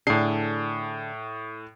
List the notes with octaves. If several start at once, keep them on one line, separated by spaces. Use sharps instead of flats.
A2 D3 D4 G#4 C7